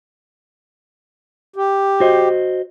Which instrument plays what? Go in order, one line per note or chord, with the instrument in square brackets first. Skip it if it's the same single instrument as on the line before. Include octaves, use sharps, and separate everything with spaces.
[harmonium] G4
[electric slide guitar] F#4 C5 D#5